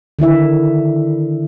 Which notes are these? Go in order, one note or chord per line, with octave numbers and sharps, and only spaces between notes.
D3 D#3 E4 E5